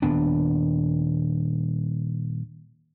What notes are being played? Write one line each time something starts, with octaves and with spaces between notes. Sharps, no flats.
D#1 D#2 B3 D4